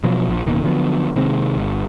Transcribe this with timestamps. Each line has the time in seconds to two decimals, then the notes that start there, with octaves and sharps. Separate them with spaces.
0.04 B2 F3 F#3
0.28 A#1 F3
0.46 D1 B2 D#3 A#3
0.64 D3 F3 F#3 B3
1.16 C3 D#3 G#3 C4
1.57 G1